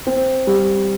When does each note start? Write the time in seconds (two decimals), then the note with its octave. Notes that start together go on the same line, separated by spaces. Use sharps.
0.07 C4
0.47 G3